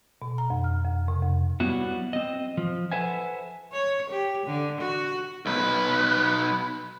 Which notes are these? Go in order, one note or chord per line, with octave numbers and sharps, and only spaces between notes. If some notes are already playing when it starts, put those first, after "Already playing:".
B2
A#5
F2
F6
F2
C3
F2
F#3 G3 B3 E4 F#4
C4 D#5
F3
A4 B4 C5 E5 F#5 G#5
C#5
G4
D3
F#4
B1 B4